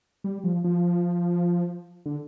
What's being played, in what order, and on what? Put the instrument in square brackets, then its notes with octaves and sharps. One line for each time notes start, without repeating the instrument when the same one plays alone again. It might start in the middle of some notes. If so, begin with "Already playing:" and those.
[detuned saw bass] G3
F3
F3
D3